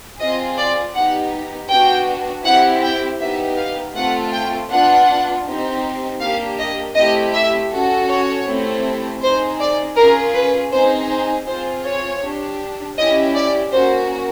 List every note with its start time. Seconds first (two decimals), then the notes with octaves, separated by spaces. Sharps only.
0.19 C4 F4 G#4 D#5
0.57 D5
0.94 B3 D#4 G4 F#5
1.70 B3 D4 F#4 G5
2.44 C4 E4 G4 F#5
2.82 G5
3.20 B3 D#4 G4 E5
3.57 F5
3.95 A3 C4 F4 A4 F#5
4.32 G5
4.70 B3 D4 F4 F#5
5.45 C4 D#4 G4
6.20 A#3 D4 G4 F5
6.59 D#5
6.96 A3 C4 E4 G4 D#5
7.34 E5
7.71 C#4 F#4 A4
8.09 C#5
8.46 A3 C4 E4 G4
9.21 C4 D#4 G#4 C5
9.59 D5
9.96 C#4 F4 G#4 A#4
10.34 B4
10.71 C4 D#4 G#4 C5
11.08 C5
11.47 C4 F4 G#4 C5
11.84 C#5
12.21 D4 G4
12.97 C#4 E4 G4 D#5
13.35 D5
13.72 A#3 C#4 F#4 C5